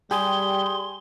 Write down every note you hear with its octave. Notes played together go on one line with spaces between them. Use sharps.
G3 G4 G#4 C6